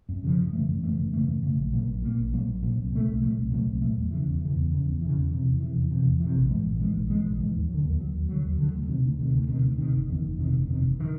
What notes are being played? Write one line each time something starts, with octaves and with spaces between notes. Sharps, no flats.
F#2
C#3 F3
F#2
C#3 E3 A3
F#2
C#3 E3 A3
F#2
C#3 E3 A3
F#2
C#3 E3 A3
A#1
A#2 F#3 A#3
A#1
A#2 F#3 A#3
A#1
A#2 F#3 A#3
A#1
A#2 F#3 A#3
C2
A#2 F#3 A3
C2
A#2 F#3 A3
C2
A#2 F#3 A3
C2
A#2 F#3 A3
E2
C#3 E3
E2
C#3 E3
E2
C#3 E3
E2
C#3 E3
E2
C3 E3
E2
C3 E3
E2
C3 E3
E2
C3 E3
A#1
G#2 E3 G#3
A#1
G#2 E3 G#3
A#1
G#2 E3 G#3
A#1
G#2 E3 G#3
D#2
D3 F#3
D#2
D3 F#3
D#2
D3 F#3
D#2
D3 F#3
D2
C3 D#3
D2
C3 D#3
D2
C3 D#3
D2
C3 D#3
F#1
E2 C3 D#3
F#1
E2 C3 D#3
F#1
E2 C3 D#3
F#1
C3 D#3